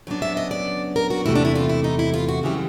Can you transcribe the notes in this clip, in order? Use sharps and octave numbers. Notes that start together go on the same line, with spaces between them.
C#3 F#3 B3 D4
E5
D#5
D5
A#4
F#4
E2 C3 E3 A3 E4
D4
E4
F4
E4
D#4
E4
F4
F#4
F#2 C#3 E3 G3 G4